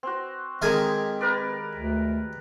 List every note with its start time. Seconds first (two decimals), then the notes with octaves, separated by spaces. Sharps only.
0.03 C4 F#4
0.62 D#3 G#3 C4 D#4 G4 A4 G#5
1.21 A#4 B4 D5
1.75 D2